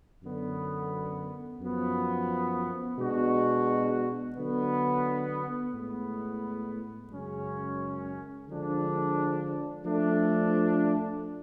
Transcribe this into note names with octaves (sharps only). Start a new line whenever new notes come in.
F#2 D3 F#3 B3
F#2 F3 B3
B2 G#3 D4 F#4
D3 F#3 B3
A2 G#3 B3
F#2 C#3 G#3 C#4
D3 F3 G#3 D4
F3 A3 D4